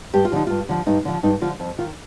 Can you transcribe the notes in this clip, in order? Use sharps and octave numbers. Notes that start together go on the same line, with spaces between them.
G2 G4
F4
D3 F3 D#4
G2 F4
D3 F3
G2 D#4
D3 F3
G2 D#4
D3 F3 F4
F2
D#3 F4